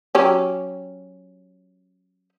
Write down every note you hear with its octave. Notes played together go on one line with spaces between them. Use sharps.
F#3 C#4 G4